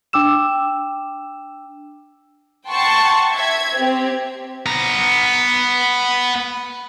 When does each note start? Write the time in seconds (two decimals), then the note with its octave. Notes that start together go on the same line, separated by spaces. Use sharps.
0.13 D4 G5 D6 E6 E7
2.68 F#5 G5 A5 C6 C#6
3.34 E5 G#6
3.76 C4 G4
4.66 B3 A#5